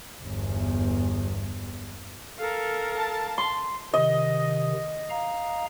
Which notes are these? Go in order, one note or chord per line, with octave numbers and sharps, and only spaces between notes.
G1 E2
A4 A#4 F5
A5
C6
C3 D#3 D#5
F5 A#5